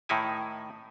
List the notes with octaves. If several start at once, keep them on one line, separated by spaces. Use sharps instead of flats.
A2 D#3 D#4 E4 G#5